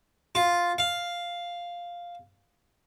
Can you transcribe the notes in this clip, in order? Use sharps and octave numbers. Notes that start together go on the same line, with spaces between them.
F4
F5